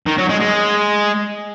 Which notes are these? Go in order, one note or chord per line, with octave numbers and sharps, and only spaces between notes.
D#3
F#3
G#3
G#3